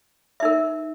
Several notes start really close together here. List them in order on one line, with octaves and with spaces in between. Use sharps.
E5 D#4 A#4